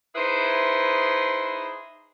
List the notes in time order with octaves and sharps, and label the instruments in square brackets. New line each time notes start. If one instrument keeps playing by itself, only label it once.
[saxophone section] D#4 E4 G#4 B4 C5